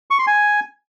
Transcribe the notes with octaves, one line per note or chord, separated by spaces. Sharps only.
C#6
C6
G#5